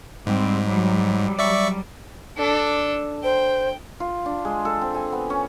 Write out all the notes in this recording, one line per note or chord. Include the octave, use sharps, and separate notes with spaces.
G#2 G3 C4
F#3 G3
D5 E5 C#6
D4 A4
C5 G5
F4
D4
G#3
A4
C4
G#5
B3
C#4